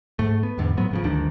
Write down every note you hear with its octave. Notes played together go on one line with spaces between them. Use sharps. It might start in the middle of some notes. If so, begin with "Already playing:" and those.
G#2 A3
B3
E2 G#2 D3
A2 F3 F#3 B3
G#1 C#3 F3
G1 D2 D#3 D4